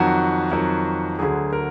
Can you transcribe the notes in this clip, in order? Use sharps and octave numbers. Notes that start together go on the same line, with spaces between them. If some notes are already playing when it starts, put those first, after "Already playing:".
Already playing: F2 D#3 F#3 F#4
F2 D#3 F#3
D2 D3 F#3 G#4
A#4